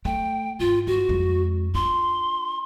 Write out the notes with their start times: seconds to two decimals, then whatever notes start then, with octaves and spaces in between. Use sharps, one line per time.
0.05 A3 G5
0.59 G#2 A3 F4
0.87 G2 F#4
1.09 F2 G#3
1.75 D4 F4 C6